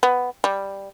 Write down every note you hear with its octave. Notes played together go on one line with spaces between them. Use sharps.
B3
G3